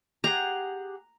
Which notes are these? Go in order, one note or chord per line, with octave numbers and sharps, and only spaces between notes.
G4 G#4 F#5 A#5